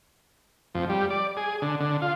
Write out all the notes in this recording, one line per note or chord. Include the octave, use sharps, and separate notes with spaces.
F2
G3
D5
G#4
D3
D3
F4